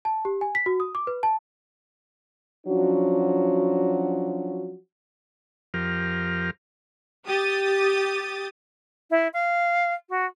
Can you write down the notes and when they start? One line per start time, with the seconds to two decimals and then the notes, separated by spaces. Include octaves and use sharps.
0.05 A5
0.25 G4
0.41 G#5
0.55 B6
0.66 F#4
0.80 D#6
0.95 D6
1.07 B4
1.23 A5
2.67 F3 F#3 C#4 D4 F#4
5.74 F2 F3 G4 A#4 F6
7.26 G4 D#6 A6
9.10 E4
9.33 F5
10.09 F#4